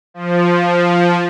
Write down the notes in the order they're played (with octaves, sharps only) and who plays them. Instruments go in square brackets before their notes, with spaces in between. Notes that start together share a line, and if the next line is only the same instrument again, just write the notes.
[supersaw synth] F3